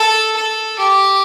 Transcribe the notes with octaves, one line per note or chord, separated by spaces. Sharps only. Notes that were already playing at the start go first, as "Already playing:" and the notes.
Already playing: A4
A4
G4